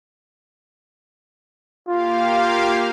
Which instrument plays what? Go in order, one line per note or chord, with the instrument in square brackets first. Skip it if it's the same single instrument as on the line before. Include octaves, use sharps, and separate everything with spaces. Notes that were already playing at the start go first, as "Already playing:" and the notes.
[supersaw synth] A#3 G4 F5 [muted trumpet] F4